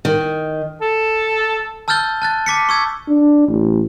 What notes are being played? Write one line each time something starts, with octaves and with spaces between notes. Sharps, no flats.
D#3
A4
A5 E6 F6 G6 A6 G7
A5 F#6 A6
A5 D6 B6 C#7
C#6 E6 G#6
D4
A1